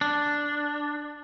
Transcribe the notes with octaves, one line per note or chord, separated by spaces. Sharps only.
D4